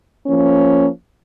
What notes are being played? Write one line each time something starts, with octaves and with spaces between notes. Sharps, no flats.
F3 A#3 C#4